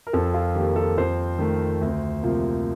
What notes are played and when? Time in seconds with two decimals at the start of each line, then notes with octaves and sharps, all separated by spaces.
0.07 A#4
0.13 F2 A4
0.34 F4
0.55 D#3 A#3 G4
0.76 A4
0.98 F2 C5
1.39 D#3 A3
1.81 D2
2.23 C3 F3 A#3